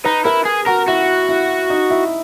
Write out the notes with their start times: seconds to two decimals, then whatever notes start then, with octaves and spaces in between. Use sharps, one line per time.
0.05 D#4 B4
0.25 E4 A#4
0.45 G#4
0.66 F#4 A#4
0.88 E4 F#4
1.29 E4
1.70 D#4
1.90 E4